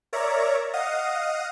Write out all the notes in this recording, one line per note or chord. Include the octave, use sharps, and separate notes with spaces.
A#4 C#5 D5 E5 A#5
D#5 F5 F#5 D#6